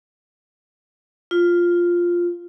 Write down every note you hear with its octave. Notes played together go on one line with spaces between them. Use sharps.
F4